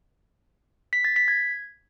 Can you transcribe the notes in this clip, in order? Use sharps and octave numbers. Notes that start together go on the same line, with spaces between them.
B6
A6
B6
G#6